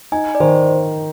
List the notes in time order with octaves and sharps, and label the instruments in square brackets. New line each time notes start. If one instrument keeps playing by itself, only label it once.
[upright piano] D#4 [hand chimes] G#5
[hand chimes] D5
[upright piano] D#3 [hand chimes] C5